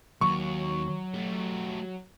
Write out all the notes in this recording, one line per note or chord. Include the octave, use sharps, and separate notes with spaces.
D#2 F#3 C#6
A3 G4